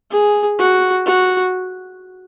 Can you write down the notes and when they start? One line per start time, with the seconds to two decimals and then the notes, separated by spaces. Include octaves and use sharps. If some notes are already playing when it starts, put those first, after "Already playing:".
0.11 G#4
0.59 F#4
1.06 F#4